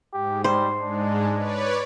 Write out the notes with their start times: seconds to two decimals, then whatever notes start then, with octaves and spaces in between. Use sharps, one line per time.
0.13 G#2 G4
0.44 G3 C5
0.82 G#2 G#3 D4
1.35 B4 C#5 D5